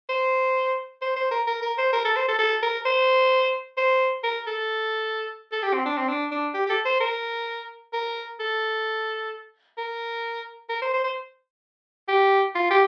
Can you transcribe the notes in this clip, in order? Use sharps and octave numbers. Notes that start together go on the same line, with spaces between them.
C5
C5
C5
A#4
A#4
A#4
C5
A#4
A4
C5
A4
A4
A#4
C5
C5
A#4
A4
A4
G4
C4
D4
C4
D4
D4
G4
G4
A4
C5
A#4
A#4
A4
A#4
A#4
C5
C5
C5
G4
F4
G4